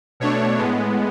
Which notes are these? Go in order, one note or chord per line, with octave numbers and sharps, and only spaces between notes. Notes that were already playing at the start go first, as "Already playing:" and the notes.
B2 A3 D4 C#5
A2 G#3 B3